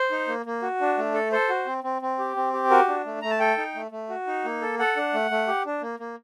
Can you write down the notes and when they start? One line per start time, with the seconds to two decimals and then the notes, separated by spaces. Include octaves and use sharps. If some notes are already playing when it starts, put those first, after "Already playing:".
Already playing: C5
0.11 D#4
0.28 A#3
0.46 A#3
0.62 F#4
0.81 D4
0.97 A3
1.14 A4
1.32 A4 C5
1.49 F#4
1.66 C4
1.84 C4
2.02 C4
2.19 G4
2.36 C4
2.53 G4
2.70 F#4 A#4
2.88 D4
3.06 A3
3.22 A3 A#5
3.30 A5
3.40 A4 G5
3.58 D#4
3.75 A3
3.91 A3
4.09 F#4
4.27 D#4
4.44 A#3
4.62 A4
4.79 A4 F#5
4.96 D4
5.14 A3
5.31 A3
5.47 G4
5.66 D4
5.82 A#3
6.00 A#3